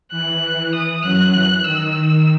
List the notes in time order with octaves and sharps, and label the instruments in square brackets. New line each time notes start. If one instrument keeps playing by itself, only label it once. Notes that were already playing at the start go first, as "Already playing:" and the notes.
[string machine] E3 [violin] F#6
[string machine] E3 [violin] D#6
[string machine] F#2 F#3 [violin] F#6
[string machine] E3
[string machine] D#3 [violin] E6